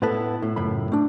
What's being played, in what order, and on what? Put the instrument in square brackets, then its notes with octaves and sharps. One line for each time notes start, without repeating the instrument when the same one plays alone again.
[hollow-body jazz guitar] A2 B3 E4 A4 B4
A2
C#2 F#2 A2 B5
A3 D4